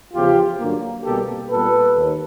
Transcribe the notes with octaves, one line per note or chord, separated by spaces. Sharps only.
E2 C#3 F3 F4 G4
G2 D3 F#3 A#3
C2 B2 G3 A#3 G4 A4
A#2 G3 B3 A4 B4
D#2